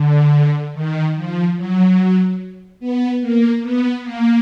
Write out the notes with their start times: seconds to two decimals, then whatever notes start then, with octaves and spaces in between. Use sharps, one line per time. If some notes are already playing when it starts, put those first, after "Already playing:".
Already playing: D3
0.74 D#3
1.15 F3
1.57 F#3
2.80 B3
3.21 A#3
3.62 B3
4.03 A#3